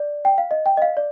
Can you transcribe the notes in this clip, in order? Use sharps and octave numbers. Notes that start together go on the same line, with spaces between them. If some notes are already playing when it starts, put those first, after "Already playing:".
Already playing: D5
G5
F5
D#5
G5
D#5
F5
D5